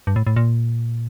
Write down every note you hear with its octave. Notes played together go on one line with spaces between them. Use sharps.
G2
A2
A2
A#2